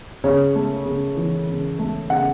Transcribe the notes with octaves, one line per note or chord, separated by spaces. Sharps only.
C#3 C#5
A3
C#3
E3
C#3
A3
C#3 F#5